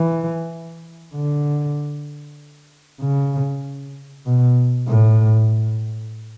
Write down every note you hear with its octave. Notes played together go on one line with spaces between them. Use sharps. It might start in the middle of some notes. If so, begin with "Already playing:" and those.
Already playing: E3
D3
C#3
B2
A2